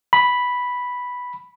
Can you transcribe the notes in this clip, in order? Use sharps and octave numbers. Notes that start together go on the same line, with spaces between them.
B5